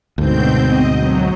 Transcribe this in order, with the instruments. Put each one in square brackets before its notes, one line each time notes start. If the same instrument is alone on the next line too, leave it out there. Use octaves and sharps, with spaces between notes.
[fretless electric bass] D2 G#2 [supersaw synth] B2 C4 G6
[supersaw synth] D#5
F#3